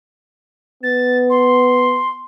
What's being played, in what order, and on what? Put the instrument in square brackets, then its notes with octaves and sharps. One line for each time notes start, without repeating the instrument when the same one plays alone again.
[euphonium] B3 [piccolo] A6
[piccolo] C6